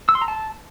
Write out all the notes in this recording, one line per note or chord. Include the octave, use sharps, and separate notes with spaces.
E6
C6
A#5
A5